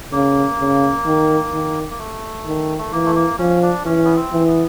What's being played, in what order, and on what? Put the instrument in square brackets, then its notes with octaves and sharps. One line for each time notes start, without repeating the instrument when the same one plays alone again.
[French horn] C#3 [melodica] A#3
[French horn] C#3
D#3
D#3
[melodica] A#3
A3
[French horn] D#3
[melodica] A3
[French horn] E3 [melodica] A#3
[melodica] A3
A#3
[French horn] F3 [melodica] C#4
[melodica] D4
[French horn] E3 [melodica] C#4
[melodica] B3
C4
[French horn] E3
[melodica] B3